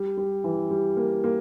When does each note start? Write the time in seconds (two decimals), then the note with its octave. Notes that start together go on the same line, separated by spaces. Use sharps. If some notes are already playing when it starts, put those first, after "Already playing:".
Already playing: G3
0.17 G3
0.44 E3
0.70 G3
0.97 A#3
1.24 A#3